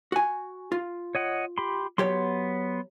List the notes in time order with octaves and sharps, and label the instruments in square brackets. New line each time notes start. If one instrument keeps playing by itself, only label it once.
[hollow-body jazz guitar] F#4 G#5
F4
[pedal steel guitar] C#5 D#5 F#5
G4 B5 C6
[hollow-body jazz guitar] F#3 G4 C#5 [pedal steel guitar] B3 C6